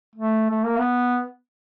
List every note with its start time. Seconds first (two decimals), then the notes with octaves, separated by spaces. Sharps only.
0.16 A3
0.50 A3
0.64 A#3
0.78 B3